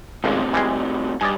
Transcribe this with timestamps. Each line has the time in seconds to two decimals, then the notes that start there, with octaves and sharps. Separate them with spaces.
0.24 G#1 C#2 A2 C3
0.53 E3 G3 G#3
1.21 G2 D5 D#5 G#5